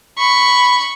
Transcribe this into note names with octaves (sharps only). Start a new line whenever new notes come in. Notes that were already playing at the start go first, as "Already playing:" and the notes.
B5 C#6